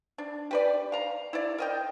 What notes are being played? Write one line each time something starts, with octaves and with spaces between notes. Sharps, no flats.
D4
G4 B4 D5
F5 A#5
E4 D5
A#4 D#5 G5